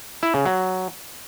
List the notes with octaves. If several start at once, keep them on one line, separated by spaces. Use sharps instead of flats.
E4
C#3
F#3